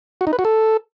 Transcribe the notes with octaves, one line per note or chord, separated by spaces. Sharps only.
F#4
D#4
B4
F#4
A4